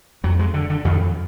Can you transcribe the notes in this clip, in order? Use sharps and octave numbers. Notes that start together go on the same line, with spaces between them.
F2 F#3
G#3
D3
D3
F2 D#3